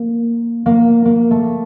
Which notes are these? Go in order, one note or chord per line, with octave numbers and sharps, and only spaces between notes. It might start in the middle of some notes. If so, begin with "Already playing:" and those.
Already playing: A#3
A#3
A#3
A3